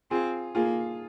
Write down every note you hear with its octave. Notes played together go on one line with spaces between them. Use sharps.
C4 F4 G#4
A#3 F4 G#4